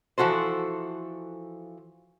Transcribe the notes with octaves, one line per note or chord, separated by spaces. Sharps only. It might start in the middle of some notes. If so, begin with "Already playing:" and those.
E3 F3 F#4 A4 C5